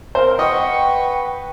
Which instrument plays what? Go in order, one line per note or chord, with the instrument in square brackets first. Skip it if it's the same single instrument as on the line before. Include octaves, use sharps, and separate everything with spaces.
[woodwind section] A#3 C4 A#4 [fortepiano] C5
[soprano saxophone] B4 [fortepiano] D#5 [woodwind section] F#5 C#6 [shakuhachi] G5